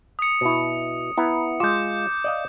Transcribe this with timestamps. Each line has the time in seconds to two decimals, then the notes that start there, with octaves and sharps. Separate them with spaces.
0.19 D#6 C#7
0.41 B2 E4
1.17 B3 E4 A#5
1.60 G#3 F4 D6 G6
2.24 D5 D#5 F5